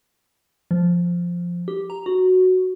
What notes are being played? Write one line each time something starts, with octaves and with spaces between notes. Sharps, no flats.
F3
G4
A#5
F#4